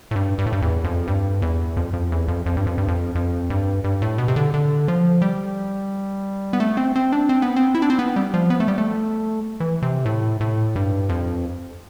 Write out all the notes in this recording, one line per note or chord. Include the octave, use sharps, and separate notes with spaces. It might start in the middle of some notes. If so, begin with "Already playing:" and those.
A2
G2
G2
A2
G2
E2
F2
G2
E2
F2
F2
E2
F2
F2
G2
F2
G2
F2
F2
G2
G2
A2
B2
C3
D3
D3
F3
G3
B3
A3
C4
C4
D4
C4
B3
C4
E4
D4
C4
B3
G3
F3
B3
A3
G3
A3
E3
C3
A2
A2
G2
F2